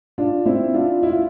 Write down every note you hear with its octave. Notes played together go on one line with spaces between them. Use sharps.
D4 F4
C4 E4
D4 F4
E4
F4